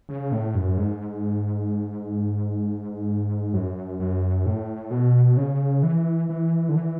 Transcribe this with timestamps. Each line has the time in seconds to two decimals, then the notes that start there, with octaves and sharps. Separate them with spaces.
0.09 C#3
0.32 A2
0.55 F#2
0.78 G#2
3.53 F#2
3.99 F#2
4.46 A2
4.91 B2
5.37 C#3
5.83 E3
6.29 E3
6.69 D3
6.75 E3